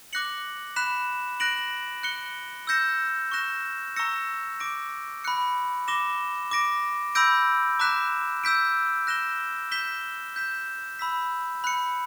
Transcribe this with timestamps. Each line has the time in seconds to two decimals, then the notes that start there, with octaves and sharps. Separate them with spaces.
0.13 D6 F#6 A#6 C#7 F#7
0.76 B5 F#6 B6 E7
1.40 F#6 A#6 D7 F#7
2.03 F#6 C#7 G7
2.67 E6 G6 A#6 C#7 E7
3.32 C#6 F#6 A#6 E7 G7
3.96 A#5 C#6 E6 A#6 C#7
4.60 D6 A#6 D7
5.24 B5 F#6 C#7
5.88 D6 A#6 E7 G7
6.51 D6 A#6 D7
7.15 B5 E6 G6 A#6 D7
7.80 A#5 D6 F#6 B6 E7
8.44 E6 G6 B6 D7
9.07 F#6 A#6 E7 G7
9.71 G6 B6 E7 G7
10.36 G6 B6 E7
10.99 B5 E6 B6
11.64 B5 F#6 C#7